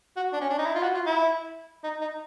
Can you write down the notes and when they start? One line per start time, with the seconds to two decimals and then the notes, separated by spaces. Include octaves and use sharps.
0.16 F#4
0.33 D4
0.41 C#4
0.49 D4
0.58 D#4
0.66 E4
0.75 F4
0.83 F#4
0.94 F4
1.06 E4
1.83 D#4
2.01 D#4